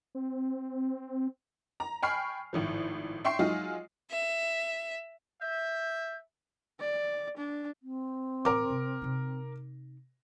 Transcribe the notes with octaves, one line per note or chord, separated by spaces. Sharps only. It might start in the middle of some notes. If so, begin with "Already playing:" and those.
C4
A#5
G5 G#5 B5 C#6 F6 C7
G#1 A2 F3
E5 G5 C6 C#6 C7
F#3 G#3 D#4 F4
E5
E5 G6
D5
D4
C4
A2 E3 A#4 D6
C3
C3 D#4